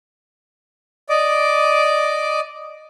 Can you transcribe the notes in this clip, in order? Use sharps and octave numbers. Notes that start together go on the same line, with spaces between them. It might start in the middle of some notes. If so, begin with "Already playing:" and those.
D5 D#5 D6